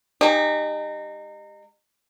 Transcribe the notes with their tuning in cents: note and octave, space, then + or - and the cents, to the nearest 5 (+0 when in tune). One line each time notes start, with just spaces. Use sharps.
G#3 +0 D#4 -25 G4 +15